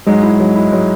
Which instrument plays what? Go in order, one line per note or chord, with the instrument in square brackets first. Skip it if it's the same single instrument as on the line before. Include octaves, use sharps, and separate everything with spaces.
[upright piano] G#2 G#3 [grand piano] F#3
[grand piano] E4
F#3
E4
[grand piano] F#3 [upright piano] G#3